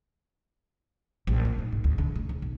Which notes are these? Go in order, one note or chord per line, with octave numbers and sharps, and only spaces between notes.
A#1
A#3
D#4
G#2
D2
D3
D2
C#3
B1